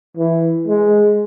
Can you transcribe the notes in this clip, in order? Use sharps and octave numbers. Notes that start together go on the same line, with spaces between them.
E3
G#3